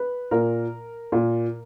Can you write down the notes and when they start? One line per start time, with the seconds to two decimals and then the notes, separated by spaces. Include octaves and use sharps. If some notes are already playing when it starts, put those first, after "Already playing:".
Already playing: B4
0.31 A#2 A#4
1.12 A#2